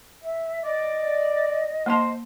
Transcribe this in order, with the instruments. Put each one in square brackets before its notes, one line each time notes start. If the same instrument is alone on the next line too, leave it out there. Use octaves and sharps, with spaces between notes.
[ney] E5
[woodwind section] D5 [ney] D#5
[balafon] A#3 A5 [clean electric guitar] C5 B5 C6